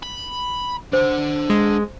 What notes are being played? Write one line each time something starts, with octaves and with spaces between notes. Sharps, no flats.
B5
D4 C5 F#5
G#3